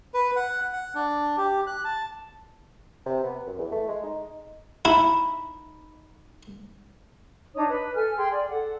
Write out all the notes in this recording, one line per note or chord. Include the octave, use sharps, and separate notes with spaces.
B4
F#5
F#5
D4
G4
F#6
A5
C3
B3
F#2
E2
A3
G#3
D#4
D#4 E4 B5
D4 D#4 C#5 D#6
B4
A4 G#5 F6
G#4 G5 C6
D5
A4 F#5